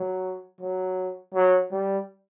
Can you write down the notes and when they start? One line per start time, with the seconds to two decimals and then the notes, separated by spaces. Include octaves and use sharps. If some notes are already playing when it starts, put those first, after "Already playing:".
Already playing: F#3
0.61 F#3
1.34 F#3
1.72 G3